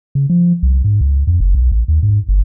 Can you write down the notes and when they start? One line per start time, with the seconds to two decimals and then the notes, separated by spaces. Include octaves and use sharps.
0.15 C#3
0.30 F3
0.63 C2
0.84 G#2
1.01 C#2
1.27 F2
1.40 F#1
1.55 B1
1.72 A1
1.88 D#2
2.03 G#2
2.29 G1